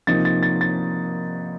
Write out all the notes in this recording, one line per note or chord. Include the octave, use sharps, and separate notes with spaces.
C3 F3 A#3 D#4 A6
A6
A6
A6